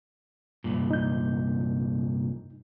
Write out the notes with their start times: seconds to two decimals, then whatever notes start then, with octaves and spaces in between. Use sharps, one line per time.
0.64 C2 G2 A#2
0.91 D#4 G6